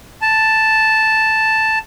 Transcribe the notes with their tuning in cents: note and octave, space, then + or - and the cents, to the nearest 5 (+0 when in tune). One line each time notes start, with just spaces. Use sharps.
A5 +0